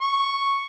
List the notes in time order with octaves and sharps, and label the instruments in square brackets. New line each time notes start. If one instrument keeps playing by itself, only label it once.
[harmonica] C#6